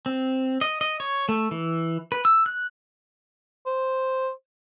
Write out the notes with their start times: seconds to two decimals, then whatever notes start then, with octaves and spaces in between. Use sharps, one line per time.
0.06 C4
0.61 D#5
0.81 D#5
1.00 C#5
1.29 A3
1.51 E3
2.12 B4
2.25 E6
2.46 F#6
3.66 C5